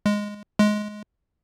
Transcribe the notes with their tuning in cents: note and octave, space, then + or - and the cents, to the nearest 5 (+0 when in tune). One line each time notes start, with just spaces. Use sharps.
G#3 -5
G#3 +15